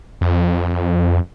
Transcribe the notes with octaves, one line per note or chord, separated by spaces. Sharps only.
F2